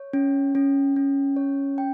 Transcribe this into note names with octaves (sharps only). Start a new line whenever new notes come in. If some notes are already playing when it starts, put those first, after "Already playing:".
Already playing: C#5
C#4
C#4
C#4
C#5
G5